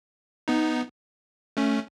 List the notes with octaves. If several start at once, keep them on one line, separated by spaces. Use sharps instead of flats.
B3 D#4
A3 C#4